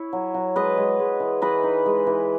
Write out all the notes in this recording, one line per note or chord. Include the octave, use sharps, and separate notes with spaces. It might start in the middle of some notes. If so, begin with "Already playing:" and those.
Already playing: E4 C#5
F#3
F#3
G#3 B4 D#5
G#3
G#3
E3
E3 B4 D#5
D#4
G#3
E3